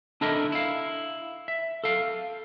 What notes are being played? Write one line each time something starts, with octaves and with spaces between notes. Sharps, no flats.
D4 E4 A4 A#4 D#5 E5
E4 F5
E5
A4 F5